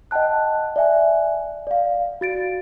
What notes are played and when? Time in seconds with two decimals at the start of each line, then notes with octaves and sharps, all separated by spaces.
0.11 D#5 F#5 G5 A5 F#6
0.76 D5 E5 G#5
1.67 D5 F5
2.21 F#4 A6 D7